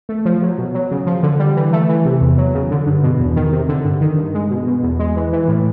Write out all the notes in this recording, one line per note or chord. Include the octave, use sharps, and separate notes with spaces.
A3
F3
F#3
B2
F#3
C#3
F3
D3
G3
E3
A3
E3
C3
E2
F#3
C#3
D3
G2
B2
E2
D#3
C3
D3
G2
D#3
G2
G#3
B2
B2
E2
G#3
E3
E3
A2